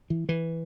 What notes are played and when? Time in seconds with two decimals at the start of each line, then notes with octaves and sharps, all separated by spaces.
0.10 E3
0.29 E3